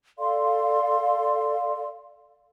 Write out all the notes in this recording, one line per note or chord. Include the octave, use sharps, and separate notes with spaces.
A4 D5 F5 C6